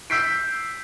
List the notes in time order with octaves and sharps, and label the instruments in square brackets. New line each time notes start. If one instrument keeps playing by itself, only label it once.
[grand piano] E6 G6 B6 C7 D7